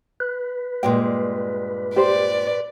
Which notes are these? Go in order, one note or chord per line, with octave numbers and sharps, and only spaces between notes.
B4
G2 A#2 G#3 G5
G4 C5 D5